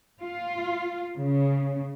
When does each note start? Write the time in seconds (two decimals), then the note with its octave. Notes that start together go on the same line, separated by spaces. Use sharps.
0.23 F4
1.16 C#3